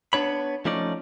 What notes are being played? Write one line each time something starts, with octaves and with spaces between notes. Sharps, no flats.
B3 D4 C#5 B5
F3 A3 C#4 D#4 D5